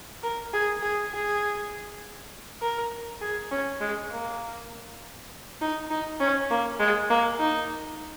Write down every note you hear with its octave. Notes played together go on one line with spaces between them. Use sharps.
A#4
G#4
G#4
G#4
A#4
G#4
C#4
G#3
A#3
D#4
D#4
C#4
A#3
G#3
A#3
D#4